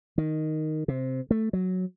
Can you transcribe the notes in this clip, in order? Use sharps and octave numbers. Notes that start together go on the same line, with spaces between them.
D#3
C3
A3
F#3